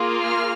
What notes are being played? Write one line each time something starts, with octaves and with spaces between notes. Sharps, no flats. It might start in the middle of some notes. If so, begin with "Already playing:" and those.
Already playing: A#3 F4 G#4
F6